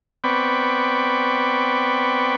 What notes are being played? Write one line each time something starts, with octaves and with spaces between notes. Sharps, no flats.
B3 C4 D5 G5 B5 C#6